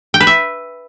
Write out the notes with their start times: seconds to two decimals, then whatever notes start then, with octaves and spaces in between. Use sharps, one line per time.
0.14 G5
0.20 B4
0.27 E5